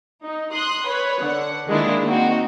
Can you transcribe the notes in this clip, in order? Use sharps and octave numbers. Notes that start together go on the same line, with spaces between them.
D#4
C6 D#6 F#6
B4 C#5 B5
D3 F#5
D#3 G#3 A#3 D4 E4 F4
A#3 C4 D#4 F#4